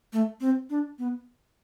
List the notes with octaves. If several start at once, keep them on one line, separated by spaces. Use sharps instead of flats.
A3
C4
D4
B3